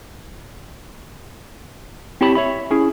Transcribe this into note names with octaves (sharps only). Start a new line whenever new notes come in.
C4 E4 G4 C#5 A5 B5
C#5 E5 B5
C#4 E4 G#4